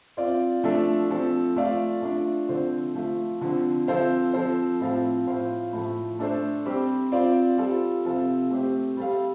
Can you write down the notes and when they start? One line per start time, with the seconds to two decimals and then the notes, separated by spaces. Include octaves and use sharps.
0.17 C4 F4 D5 F5
0.64 F3 A3 D4 A4
1.10 F3 C4 A4
1.56 A3 F4 D5 F5
2.02 A3 D4 F4
2.49 D3 F3 C4 A4 C5
2.95 F3 A3 F4
3.41 D3 F3 C4
3.87 F3 C4 A4 C5 F5
4.34 F3 C4 A4 C5
4.80 A2 F3 C4 A4 F5
5.26 A2 A3 F4 C5 F5
5.73 A2 F3 A3
6.19 A3 D4 A4 C5
6.65 G3 C4 G4
7.12 C4 F4 D5 F5
7.58 G3 F4 A4
8.04 C3 F3 C4 A4 F5
8.51 A3 C4 G4 C5
8.97 G3 C4 A4 F5